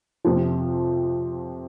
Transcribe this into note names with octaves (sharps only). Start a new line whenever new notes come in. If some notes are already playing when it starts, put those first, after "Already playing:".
F2 C3 F3